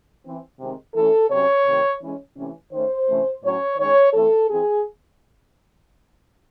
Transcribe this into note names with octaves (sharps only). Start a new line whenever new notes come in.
E3 C4
C3 D#3 G#3 C4
E3 A3 C#4 A4
C3 F#3 C#4 C#5
C3 D#3 A3
E3 G#3 C#4
C3 E3 A3 C#4
D#3 A3 C#4 C5
C3 E3 A3 C#4
A2 F#3 C#4 C#5
D#3 G#3 C#4 C#5
E3 A3 C4 A4
E3 C4 G#4